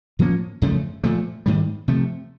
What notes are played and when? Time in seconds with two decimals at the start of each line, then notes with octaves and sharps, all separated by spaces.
0.19 A2 F3 A#3 C#4
0.62 F#2 C#3 F3 A3
1.04 A#2 F3 A3
1.46 G#2 D#3 G3
1.88 C3 F3 A3